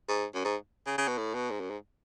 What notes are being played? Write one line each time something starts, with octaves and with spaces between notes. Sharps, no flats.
G#2
F#2
G#2
C#3
C#3
B2
A2
B2
G#2
F#2
G#2